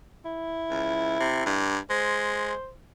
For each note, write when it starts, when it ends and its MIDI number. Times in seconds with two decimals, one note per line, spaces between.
0.25 1.67 64
0.71 1.18 37
1.20 1.43 48
1.46 1.78 43
1.90 2.53 56
1.90 2.70 72